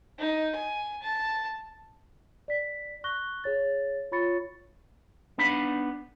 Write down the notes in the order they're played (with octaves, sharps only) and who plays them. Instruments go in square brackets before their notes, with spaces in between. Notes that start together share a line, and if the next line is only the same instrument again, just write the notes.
[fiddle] D#4
G#5
A5
[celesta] D5 B6
C#6 F#6 A#6 G7
G#4 C#5 A6
F4 C#5 B5 C#6 A6 C#7
[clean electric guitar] B3 D4 D#4 B5